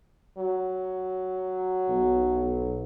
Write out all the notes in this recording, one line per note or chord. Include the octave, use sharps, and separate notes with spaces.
F#3
B1